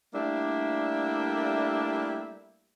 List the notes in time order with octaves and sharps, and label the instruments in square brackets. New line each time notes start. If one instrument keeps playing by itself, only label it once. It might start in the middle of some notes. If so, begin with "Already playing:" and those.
[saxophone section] G3 A3 A#3 D4 E4 E5